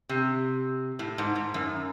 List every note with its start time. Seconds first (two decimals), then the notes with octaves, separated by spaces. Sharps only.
0.09 C3
0.99 A2
1.18 G#2
1.35 G#2
1.54 F#2